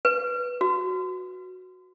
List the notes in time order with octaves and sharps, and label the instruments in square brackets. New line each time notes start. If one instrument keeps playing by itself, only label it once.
[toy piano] B4
F#4